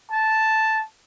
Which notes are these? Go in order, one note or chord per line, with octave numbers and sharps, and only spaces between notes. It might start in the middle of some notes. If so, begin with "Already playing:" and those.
A5